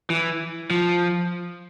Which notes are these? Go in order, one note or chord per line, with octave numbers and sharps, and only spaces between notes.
E3
F3